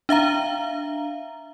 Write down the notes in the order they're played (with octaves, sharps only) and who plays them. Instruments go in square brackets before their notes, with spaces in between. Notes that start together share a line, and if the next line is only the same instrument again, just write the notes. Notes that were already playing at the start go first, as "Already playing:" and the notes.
[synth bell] D4 E5 F5 A#5